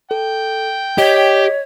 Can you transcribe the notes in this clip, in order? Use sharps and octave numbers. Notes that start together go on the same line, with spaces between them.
A4 G5
G4 C#5 D#5 B6